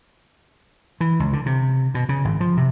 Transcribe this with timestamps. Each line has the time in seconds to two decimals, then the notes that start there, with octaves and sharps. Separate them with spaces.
1.01 E3
1.20 C#2
1.33 D3
1.46 C3
1.95 B2
2.09 C#3
2.25 G#1
2.40 F3
2.57 C3